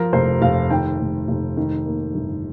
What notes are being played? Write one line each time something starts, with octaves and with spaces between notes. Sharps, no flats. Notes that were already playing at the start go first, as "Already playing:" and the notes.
Already playing: F3 A#4
F1 C5
F1 F5
D#3 G5
F1
F1
D#3
A#3
G1